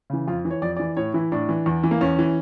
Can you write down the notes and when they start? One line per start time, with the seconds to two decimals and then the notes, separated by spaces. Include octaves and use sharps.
0.10 C#3 E3
0.27 F2 F4
0.45 E3
0.51 C#5
0.62 F2 D5
0.77 E3 D5
0.97 A2 C#5
1.14 E3 E4
1.32 A2 D4
1.49 E3
1.66 E2
1.84 E3
1.91 A#3
2.01 E2 C#4
2.19 E3